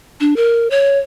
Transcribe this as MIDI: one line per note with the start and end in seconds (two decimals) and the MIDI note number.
0.20 0.36 62
0.36 0.70 70
0.71 0.98 73